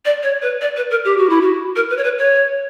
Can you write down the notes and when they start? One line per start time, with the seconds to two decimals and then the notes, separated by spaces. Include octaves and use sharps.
0.05 D5
0.23 C#5
0.42 B4
0.61 D5
0.76 B4
0.90 A#4
1.05 G4
1.17 F#4
1.30 E4
1.41 F#4
1.76 A#4
1.90 B4
1.97 C#5
2.04 B4
2.18 C#5